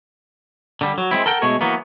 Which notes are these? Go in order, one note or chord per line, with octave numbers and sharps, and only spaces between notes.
D3 G3
F#3
G#3 C4 E4
A4 A#4 F#5 G5
B2 G#3 A3 C#5
E3 F#3 A#3 B3